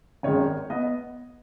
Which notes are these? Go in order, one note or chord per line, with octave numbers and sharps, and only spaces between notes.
G#1 F#2 D#3 G#3 C#5
B3 D#5